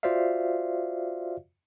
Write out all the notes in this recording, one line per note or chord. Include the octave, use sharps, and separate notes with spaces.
F4 F#4 C5 D5 E5 F5